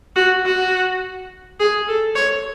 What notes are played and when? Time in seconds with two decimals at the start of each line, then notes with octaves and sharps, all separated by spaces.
0.16 F#4
0.45 F#4
1.60 G#4
1.88 A4
2.16 C#5